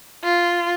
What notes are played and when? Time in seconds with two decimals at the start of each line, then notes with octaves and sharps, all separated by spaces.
0.24 F4